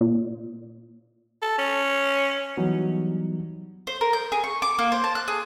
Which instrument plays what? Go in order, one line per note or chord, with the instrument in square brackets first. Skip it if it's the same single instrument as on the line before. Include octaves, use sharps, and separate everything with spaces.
[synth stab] A#2
[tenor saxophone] A4
C#4
[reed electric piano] E3 F#3 G3 B3 D#4
[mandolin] C5
A#4
G6
G#4
C#6
D6
A#3
C5
A5
F#6
G#4